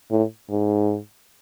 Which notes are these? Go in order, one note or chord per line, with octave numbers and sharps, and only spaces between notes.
A2
G#2